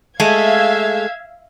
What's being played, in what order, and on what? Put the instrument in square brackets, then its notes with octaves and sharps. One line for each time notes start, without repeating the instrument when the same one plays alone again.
[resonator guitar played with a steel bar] G#3 A3 [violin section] E5 F5 G#6